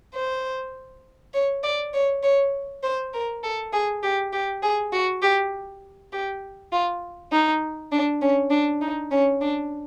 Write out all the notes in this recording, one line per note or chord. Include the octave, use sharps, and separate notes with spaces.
C5
C#5
D5
C#5
C#5
C5
A#4
A4
G#4
G4
G4
G#4
F#4
G4
G4
F4
D#4
D4
C#4
D4
D#4
C#4
D4